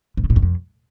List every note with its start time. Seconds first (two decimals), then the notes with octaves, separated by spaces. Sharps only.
0.17 B2
0.24 C#3
0.30 A2
0.36 F#2
0.42 F2